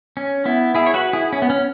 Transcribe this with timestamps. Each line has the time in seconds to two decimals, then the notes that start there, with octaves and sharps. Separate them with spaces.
0.17 C#4
0.45 B3 E4
0.75 E4 G#4
0.86 C#5
0.94 F#4 B4
1.13 E4 G#4
1.33 C#4
1.42 B3
1.50 C#4